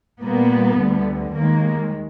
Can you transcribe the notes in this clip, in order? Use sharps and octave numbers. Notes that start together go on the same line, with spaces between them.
A#2 G3 A#3 B3
D2 D3 G3
D#2 D#3 G#3 A#3